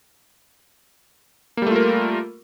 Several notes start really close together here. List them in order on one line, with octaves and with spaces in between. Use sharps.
A#3 G3 A3 F4 A#4